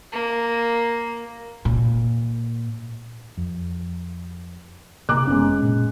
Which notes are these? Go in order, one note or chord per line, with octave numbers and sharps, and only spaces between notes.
A#3
A#2
F2
C3 A#3 A#5 D6 F#6
F#1 G#3 B3 C#4
A#2